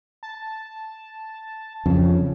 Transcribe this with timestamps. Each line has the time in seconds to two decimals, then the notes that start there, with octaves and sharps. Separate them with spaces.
0.23 A5
1.86 F2 C#3